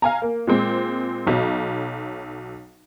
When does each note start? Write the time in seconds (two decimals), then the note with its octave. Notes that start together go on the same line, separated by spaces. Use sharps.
0.02 F5 G#5 A#5
0.22 A#3
0.47 A#2 G#3 C4
1.26 B1 F#3